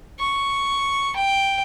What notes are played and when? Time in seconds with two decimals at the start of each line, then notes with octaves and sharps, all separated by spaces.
0.20 C#6
1.16 G5